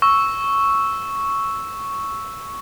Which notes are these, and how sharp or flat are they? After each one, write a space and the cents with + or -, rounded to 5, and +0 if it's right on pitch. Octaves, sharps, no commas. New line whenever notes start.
C#6 +0 E6 +0